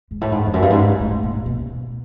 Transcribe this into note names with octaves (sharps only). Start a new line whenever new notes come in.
G#2
A2
G#2
F2
F#2
G2
G#2
A2
A2
A#2
B2